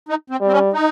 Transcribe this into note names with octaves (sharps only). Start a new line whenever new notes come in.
D#4
C4
G3
C4
C#4
D#4